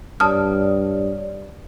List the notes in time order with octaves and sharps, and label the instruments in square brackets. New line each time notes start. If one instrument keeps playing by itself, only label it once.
[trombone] G2 [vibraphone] C#5 D5 [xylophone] A5 D#6 F6